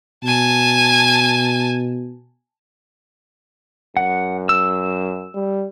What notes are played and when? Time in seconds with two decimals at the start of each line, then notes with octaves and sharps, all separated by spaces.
0.24 B2 G#5 A5
3.97 F#2 F#5
4.49 E6
5.35 G3